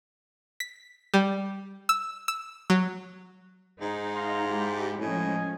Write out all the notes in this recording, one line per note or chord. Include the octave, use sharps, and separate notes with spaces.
B6
G3
E6
E6
F#3
G#2 D#4
F5 A#5 C6
G#3 E4 G4
A2 F3 G#3 C#4 D#5 G#5